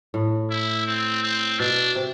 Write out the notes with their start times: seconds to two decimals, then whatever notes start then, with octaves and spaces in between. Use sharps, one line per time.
0.14 A2
0.50 E4
0.87 C4
1.23 C4
1.59 B2 D4
1.95 C3